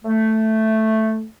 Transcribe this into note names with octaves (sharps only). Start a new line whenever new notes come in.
A3